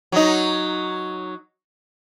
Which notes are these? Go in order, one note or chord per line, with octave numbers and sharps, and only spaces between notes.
F#3 D#4